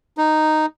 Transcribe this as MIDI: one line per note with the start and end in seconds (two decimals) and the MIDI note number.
0.18 0.66 63